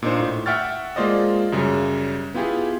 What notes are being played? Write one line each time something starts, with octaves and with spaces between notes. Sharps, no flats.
A#2 D4 D#4 C5
A2
E5 F#5 G5 C#6 F6 A6
G#3 A#3 F4 C5 D5 D#5
F#2 C#3 G3
B3 E4 F4 G4 G#4